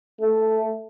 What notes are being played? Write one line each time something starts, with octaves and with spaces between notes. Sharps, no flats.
A3